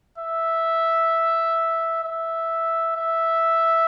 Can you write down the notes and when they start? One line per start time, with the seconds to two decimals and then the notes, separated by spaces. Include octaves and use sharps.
0.18 E5
2.04 E5
2.97 E5